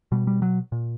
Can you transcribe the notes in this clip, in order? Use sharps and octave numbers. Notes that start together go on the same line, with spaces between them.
B2 G3
G3
F#3
A#2